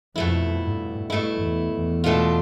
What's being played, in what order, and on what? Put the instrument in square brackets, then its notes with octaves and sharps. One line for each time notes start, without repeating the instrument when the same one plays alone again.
[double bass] F2 [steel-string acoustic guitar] B2 A3 E4
[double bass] G2
[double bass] G2 [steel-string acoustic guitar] B2 A3 E4
[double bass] E2
E2
[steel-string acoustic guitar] B2 A3 D4 F4